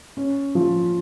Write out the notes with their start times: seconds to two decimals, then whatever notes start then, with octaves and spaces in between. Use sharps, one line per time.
0.17 C#4
0.55 F3